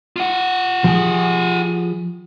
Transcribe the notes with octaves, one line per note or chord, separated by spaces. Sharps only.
F4 F#5
F3 G4 G#4